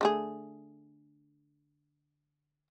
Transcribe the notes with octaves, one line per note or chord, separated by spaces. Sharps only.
D3 A3 G#4